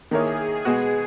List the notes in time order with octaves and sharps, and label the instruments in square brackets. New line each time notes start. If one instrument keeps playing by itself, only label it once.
[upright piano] D#3 A#3 E4 A#4 C#5 [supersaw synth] G#4
[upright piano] B2 G#3 B3 F#4